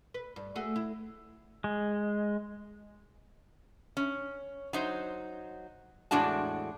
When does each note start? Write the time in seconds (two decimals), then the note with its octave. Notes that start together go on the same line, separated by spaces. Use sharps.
0.14 B4
0.36 G2
0.56 A3 F#4 G#4
0.76 E4
1.64 G#3
3.97 C#4
4.73 F#3 D#4 C5
6.11 E2 A2 G#3 D4 F#4 A5